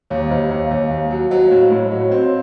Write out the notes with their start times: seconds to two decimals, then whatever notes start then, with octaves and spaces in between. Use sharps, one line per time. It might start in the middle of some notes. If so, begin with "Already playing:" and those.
0.10 D#2 C#5 F5
0.30 D#2 C5 D#5
0.50 D#2 C#5 F5
0.71 D#2 C#5 F5
0.91 D#2
1.11 F#3
1.31 F#3 C5 D#5
1.46 C#5 F5
1.51 A2
1.61 C5 D#5
1.71 A2 C#5
1.91 F#3 D#5
2.01 C#5
2.09 C4 C5 D#5
2.21 C#5 F5